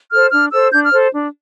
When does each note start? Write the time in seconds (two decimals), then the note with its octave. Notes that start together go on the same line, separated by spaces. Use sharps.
0.12 A4 C5 F6
0.31 D4 F6
0.52 A4 C5 E6
0.71 D4 G6
0.85 F6
0.91 A4 C5
1.12 D4